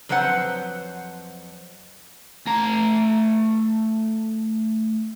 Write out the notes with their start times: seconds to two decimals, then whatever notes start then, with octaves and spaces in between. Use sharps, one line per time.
0.09 F2 F#3 B4 C5 F#5
2.47 A3 A#5